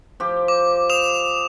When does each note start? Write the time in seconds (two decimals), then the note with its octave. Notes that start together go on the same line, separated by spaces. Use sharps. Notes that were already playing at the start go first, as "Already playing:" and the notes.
0.20 F3 G4
0.48 D6
0.90 D#6 E7 F7